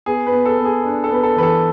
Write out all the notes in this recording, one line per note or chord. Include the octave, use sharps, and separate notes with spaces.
B3 G#4
B4
B3
A4
B3
G#4
D4
A4
B3 B4
A4
E3 B4
A4